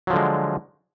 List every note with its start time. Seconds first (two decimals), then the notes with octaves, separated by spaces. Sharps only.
0.07 F#3
0.10 F3
0.13 D3
0.16 G#3